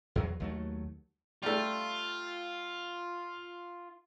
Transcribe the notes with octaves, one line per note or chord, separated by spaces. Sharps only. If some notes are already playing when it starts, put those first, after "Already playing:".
E2 F#3
D#2 F#3 A3
G3 A3 F4